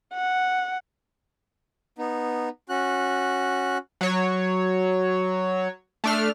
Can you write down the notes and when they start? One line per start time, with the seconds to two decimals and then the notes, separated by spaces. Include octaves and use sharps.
0.14 F#5
1.98 B3 D#4
2.69 C#4 F#4 F#6
4.01 F#3 C#5
6.04 A3 D4 F6